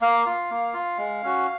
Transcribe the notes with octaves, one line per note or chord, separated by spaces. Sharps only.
A#3 F5
F4
A#3
F4
G#3
C#4 F#4